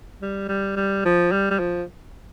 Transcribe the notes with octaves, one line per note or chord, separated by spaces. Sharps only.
G3
G3
G3
F3
G3
G3
F3